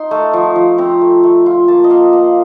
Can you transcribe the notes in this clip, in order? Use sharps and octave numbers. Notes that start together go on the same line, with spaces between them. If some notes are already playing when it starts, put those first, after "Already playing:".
Already playing: D#4 C6
A3
F3
F3
C4 A#5
A3
A3
F4
A#3 A5
D#5
A#3 F5
A#3